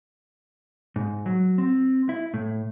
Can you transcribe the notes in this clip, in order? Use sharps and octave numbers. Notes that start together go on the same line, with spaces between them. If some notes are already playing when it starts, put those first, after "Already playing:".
G#2
F#3
C4
E4
A2